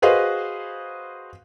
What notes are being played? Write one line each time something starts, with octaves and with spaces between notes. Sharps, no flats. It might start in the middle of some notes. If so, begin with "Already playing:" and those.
F#4 G#4 B4 C5 D#5 F5